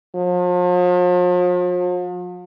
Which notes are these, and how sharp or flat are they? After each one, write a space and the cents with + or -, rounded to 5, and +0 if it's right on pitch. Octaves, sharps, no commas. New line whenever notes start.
F3 +40